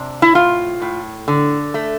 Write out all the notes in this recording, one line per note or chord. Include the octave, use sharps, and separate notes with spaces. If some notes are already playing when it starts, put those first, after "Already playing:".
Already playing: C3 D4
E4
A2 F4
A2
D3
A3